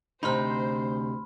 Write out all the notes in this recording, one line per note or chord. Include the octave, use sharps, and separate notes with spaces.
D2 C3 D#4 C5 B5 C6 F6